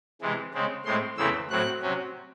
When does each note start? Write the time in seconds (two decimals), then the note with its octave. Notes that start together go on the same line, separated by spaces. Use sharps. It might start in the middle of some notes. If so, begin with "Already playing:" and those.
0.22 C3 E3 G#3
0.54 C#3 G#3 C4
0.85 A2 G#3 C4 C6
1.18 E2 C#3 E3 A3 C4 E6
1.50 A2 F#3 C4 F#6
1.82 C3 F#3 C#4